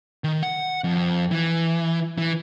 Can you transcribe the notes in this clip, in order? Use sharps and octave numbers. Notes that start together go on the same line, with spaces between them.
D#3
F#5
F2
E3
E3